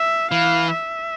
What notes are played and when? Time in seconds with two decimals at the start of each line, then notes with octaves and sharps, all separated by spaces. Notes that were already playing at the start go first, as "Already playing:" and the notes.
Already playing: E5
0.31 E3 F5
0.73 E5